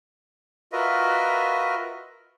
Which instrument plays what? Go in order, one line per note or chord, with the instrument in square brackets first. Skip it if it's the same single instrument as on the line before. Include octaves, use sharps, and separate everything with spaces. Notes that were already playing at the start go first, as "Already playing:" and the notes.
[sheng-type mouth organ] F4 F#4 A#4 B4 D#5 E5